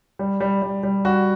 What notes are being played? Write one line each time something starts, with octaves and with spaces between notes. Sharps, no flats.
G3
G3
G3
G3
G3 F#4